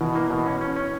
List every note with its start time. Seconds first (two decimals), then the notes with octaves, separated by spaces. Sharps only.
0.01 B2 E3
0.16 A#3
0.30 B2
0.46 C#4
0.61 C#4
0.76 C#4